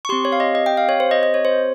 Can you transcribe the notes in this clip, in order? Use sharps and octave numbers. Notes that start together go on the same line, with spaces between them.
C#6
C4 G4 C6
C#5
F5
D#5
D#5
G5
F5
C#5
C5
D#5
D#5
C#5
C5